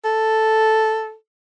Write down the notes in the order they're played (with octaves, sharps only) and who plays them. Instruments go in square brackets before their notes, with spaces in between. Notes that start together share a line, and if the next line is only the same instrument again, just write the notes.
[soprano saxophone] A4